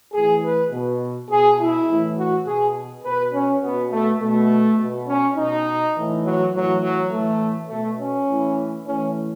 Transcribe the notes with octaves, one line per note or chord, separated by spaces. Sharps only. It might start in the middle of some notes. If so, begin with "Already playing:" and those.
A2 E3 G#4
B4
B2
B2 G#4
E4
A2 E3
F#4
B2 G#4
B2 B4
C#4
B2 B3
A3
B2 A3
B2
C#4
B2 D#4
A2 E3
F#3
A2 E3 F#3
F#3
A2 E3 A3
B2 A3
C#4
A2 E3
A2 E3 C#4